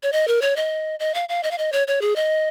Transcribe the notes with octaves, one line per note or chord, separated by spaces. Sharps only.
C#5
D#5
A#4
C#5
D#5
D#5
F5
F5
D#5
F5
D#5
C#5
C#5
G#4
D#5